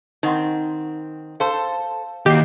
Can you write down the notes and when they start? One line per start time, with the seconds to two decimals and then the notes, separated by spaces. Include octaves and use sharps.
0.23 D#3 C4 D#4 F#5 C6
1.40 A4 C5 F5
2.26 D#2 F#4 G4 D#5 C7